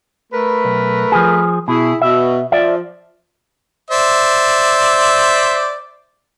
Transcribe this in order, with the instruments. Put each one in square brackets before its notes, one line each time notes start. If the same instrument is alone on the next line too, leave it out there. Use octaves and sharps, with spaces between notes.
[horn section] A3 A#4 B4
[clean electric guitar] B1
F3 G#4
[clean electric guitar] B2 [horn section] E4 G#4
[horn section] B2 [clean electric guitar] E5
[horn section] F3 [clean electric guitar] D5 E5
[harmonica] C5 D5 E5